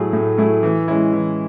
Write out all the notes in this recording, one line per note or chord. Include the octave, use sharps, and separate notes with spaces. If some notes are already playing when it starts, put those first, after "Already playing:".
Already playing: A2 F#3 A3 E4 G#4
A2
F#3 A3 E4 G#4
E3
G#3 C#4 E4
E3